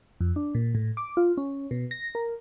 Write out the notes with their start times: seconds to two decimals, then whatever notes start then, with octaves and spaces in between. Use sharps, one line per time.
0.21 F2
0.36 D4
0.55 A#2
0.75 A2
0.97 D6
1.17 F4
1.37 C#4
1.71 B2
1.91 A#6
2.15 A#4